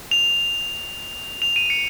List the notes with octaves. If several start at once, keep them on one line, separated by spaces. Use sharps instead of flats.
F7
F7
D#7
C#7